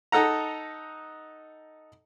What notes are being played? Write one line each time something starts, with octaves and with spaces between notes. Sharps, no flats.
D#4 A4 F#5 A#5